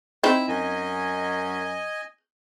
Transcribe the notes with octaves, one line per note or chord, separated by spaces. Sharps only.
C4 D#4 E4
F#2 D#5 G#5